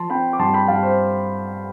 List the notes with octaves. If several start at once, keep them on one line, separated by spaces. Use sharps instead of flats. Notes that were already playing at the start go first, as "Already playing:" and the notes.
Already playing: F3 A5 C6
C4 G5 B5
D6
G2 A5 C6
G5 B5
G2 F5 A5
C5